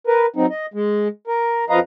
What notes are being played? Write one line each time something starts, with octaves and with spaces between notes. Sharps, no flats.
A#4 B4
F#3 C4 D#4
D#5
G#3
A#4
F2 F3 B4 D#5 F5 A#5